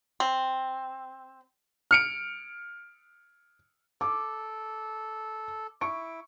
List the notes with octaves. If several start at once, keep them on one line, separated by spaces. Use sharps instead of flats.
C4
F6 C#7 D7
A4 D6
E4 C#6 D7